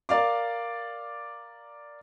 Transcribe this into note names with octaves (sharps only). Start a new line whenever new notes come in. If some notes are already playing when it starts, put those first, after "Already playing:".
A#4 D5 F5 D6